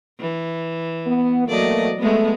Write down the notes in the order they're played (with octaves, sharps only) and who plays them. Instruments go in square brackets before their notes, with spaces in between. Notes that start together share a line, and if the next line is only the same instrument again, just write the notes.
[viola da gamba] E3
[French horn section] B3
[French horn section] B2 A3 A#3 [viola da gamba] F#3 D5 D#5
[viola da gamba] G#3 B3 [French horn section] A3